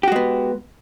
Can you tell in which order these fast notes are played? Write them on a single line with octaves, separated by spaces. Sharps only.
G4 F#4 G#3 B3